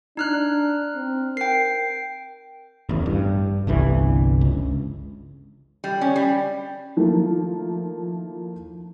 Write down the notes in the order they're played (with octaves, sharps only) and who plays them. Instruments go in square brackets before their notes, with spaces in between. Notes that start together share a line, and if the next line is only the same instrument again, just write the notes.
[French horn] D4 [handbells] D#4 F6 F#6
[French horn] C4
[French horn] A#4 [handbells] G5 C7
[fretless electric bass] A1 E2
G2
G1 C2 G2 E3
C#2
[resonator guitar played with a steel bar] G3
C#4
G3
[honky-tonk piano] D#3 F3 A3 A#3 E4